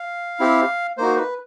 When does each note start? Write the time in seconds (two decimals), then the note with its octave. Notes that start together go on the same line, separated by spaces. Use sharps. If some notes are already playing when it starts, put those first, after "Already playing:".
Already playing: F5
0.40 C4 E4 G4
0.97 A#3 D#4 F#4 C5
1.17 B4